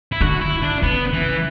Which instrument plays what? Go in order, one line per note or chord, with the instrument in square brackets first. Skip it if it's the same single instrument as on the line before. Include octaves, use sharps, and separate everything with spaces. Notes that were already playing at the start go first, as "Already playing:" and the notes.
[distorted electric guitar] E4
[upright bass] D3 [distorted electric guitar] F#4
[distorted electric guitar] E4
D4
[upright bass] C#3 [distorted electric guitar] B3
[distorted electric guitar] E3